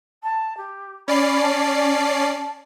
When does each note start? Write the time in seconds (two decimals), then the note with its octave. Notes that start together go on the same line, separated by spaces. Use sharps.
0.23 A5
0.57 G4
1.08 C#4 D5 B5 C7
1.41 A5